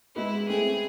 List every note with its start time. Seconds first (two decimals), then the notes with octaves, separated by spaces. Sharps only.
0.15 G#3 B3 E4
0.48 A3 C4 G#4